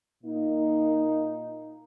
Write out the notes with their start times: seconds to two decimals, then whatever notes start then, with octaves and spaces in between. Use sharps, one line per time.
0.23 A#2 A#3 D#4